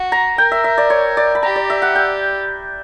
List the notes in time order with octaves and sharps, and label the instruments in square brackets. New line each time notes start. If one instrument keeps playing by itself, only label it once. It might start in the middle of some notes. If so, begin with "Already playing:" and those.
Already playing: [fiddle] F#4
[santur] A#5
[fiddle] A#4 [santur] G5
[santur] E5
E5
D5
C#5
D5
B5
[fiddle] G4 [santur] A#5
[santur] D5
E5
F#5
G5